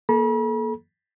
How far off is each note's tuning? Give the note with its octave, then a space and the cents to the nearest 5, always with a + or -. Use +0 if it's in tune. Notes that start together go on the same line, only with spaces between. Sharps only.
A#3 +20 A4 -30 B5 -45